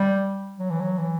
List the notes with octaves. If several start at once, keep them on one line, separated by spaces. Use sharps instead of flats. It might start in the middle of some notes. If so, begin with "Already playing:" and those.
Already playing: G3
F#3
E3
F#3
E3